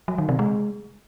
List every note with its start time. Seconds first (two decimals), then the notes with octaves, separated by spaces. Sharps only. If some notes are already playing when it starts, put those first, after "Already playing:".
0.08 F#3
0.18 D#3
0.29 C3
0.39 G#3